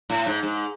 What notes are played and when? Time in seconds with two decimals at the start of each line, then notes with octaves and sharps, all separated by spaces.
0.10 A2
0.26 G#2
0.43 G#2